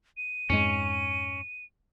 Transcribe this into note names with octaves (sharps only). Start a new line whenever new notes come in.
D#7
F2 G#2 G#3 C#4